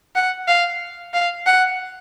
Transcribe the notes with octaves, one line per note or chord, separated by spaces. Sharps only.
F#5
F5
F5
F#5